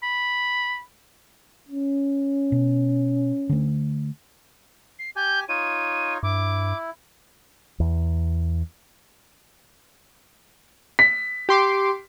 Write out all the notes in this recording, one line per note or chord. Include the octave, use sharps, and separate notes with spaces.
B5
C#4
B2
D3 A3
C7
G4 G#5 G6
D#4 F4 C#5 D#7
G2 E4 D6
E2
B6
G4 C6 D6